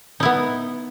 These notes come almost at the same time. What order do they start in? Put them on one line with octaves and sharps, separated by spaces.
D#4 E4 B3